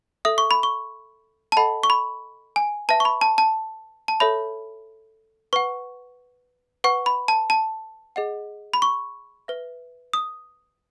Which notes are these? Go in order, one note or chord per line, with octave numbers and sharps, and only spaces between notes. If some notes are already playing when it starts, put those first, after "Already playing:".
A4 E5 D#6
C#6
B5
C#6
A5
A4 D#5 F#5 B5
C#6
B5
G#5
B4 E5 A5
C#6
B5
A5
A5
A5
A4 C#5 E5 B5
B4 F#5 C#6
B4 F#5 C#6
B5
A5
A5
G#4 D#5 F#5
B5
C#6
B4 E5
D#6